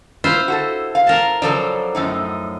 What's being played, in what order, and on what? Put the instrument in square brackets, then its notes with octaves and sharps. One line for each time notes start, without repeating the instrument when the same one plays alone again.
[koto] E4 F4 C5
[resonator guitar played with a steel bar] F#4 G#4 A4
F5
[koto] A#4 A5
[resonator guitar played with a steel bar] C#3 A4 D5 [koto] F3 F#3
[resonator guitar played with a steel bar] F#2 A2 D#4